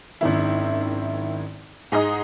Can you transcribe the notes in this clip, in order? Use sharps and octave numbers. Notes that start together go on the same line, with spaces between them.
G#1 F#2 D#3 E4
G#2 G#4 D#5 A#5 D#6